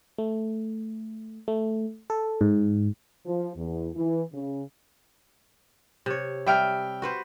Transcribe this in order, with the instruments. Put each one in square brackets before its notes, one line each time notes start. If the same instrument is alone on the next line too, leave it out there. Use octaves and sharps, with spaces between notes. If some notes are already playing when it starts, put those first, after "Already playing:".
[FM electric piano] A3
A3
A4
G#2
[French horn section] F3
E2
E3
C#3
[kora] C3 C#5
[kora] G3 [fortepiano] E5 G5 F6
[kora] F#4 B4 C5